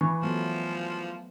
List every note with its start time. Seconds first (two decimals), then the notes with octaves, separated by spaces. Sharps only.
0.01 E3 B4 C#6
0.22 F3 F#3 A3 B3